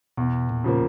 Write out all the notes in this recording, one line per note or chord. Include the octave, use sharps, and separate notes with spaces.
E2 B2
A#2
C#3 F3 A#3